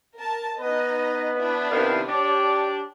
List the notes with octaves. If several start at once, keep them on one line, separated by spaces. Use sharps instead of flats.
A#4 A5
B3 D#4 B4 D#5
D4 E4
C3 D#3 F5
D4 G4 C#5 D5